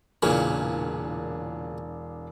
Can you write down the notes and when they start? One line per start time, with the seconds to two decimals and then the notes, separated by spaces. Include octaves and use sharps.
0.23 E1 A#2 C#3 E3 D4